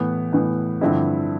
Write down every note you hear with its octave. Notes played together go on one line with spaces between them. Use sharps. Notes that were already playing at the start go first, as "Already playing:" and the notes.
Already playing: A2 E3 B3
A2 E3 B3
G2 D3 F3 C4 E4